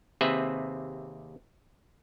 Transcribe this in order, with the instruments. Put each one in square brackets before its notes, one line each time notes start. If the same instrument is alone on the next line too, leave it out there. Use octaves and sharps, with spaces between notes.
[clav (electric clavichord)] D#2 C3 C4 G#4 B4 E5